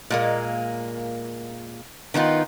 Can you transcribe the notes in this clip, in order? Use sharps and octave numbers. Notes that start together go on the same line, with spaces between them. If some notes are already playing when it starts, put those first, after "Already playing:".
A#2 G#3 A#3
D#3 B3 D#4 F4